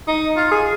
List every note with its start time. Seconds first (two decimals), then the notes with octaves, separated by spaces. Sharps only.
0.07 D#4
0.37 F4
0.51 G#4